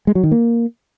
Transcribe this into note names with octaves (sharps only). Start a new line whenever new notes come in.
G#3
F#3
D#3
A#3